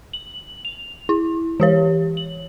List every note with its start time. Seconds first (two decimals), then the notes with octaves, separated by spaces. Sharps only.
0.13 F#7
0.65 F7
1.09 E4
1.60 E3 G4 C#5
2.17 F#7